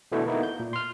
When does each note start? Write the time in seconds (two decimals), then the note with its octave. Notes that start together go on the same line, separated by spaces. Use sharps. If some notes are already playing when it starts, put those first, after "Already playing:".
0.12 B2 D3 E3 A3 D4 E4
0.26 A#3 B3 D#4 E4
0.43 G6
0.60 A#2
0.73 C6 F6